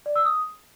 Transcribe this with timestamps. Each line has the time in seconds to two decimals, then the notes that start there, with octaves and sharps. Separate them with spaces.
0.06 D5
0.16 E6
0.25 D#6